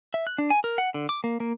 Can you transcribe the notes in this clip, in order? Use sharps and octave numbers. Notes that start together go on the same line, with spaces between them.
E5
F#6
D4
G#5
A#4
F#5
D3
D6
A#3
A#3